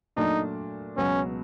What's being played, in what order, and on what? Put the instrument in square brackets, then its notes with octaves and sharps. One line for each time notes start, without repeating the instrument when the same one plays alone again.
[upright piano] A#2 F#3 A3 D4 [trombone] D#4
[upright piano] C#2 B2 F#3 B3 [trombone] C#4